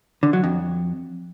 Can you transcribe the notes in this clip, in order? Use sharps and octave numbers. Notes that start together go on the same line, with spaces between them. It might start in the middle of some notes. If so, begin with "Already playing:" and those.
D3
F#3
F2